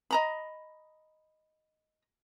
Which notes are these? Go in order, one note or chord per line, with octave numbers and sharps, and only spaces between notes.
D#5 A#5 B5